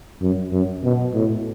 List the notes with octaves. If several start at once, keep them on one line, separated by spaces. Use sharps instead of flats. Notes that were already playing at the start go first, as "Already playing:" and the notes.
F#2
F#2
B2
A2